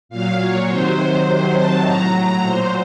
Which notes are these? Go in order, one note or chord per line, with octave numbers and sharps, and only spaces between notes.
A#2 F#3 F5
C#5
C3 D#3 F#3 C5
C3 D#3 F#3
A5
A2 F#3 A#5
A#5
A#2 F#3 C5